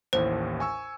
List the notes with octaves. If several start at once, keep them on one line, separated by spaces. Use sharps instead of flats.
A1 D#2 A2 C5
G#5 C#6 E6